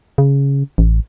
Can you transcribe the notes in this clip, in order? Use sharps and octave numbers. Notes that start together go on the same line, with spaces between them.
C#3
A1